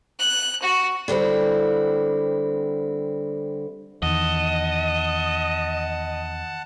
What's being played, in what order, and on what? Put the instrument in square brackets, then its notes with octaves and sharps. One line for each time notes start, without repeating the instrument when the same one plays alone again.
[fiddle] F#6
F#4
[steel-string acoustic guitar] D3 G3 C4 E4
[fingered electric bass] E2 D#3 [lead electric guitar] D#5 [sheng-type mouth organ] F#5 A5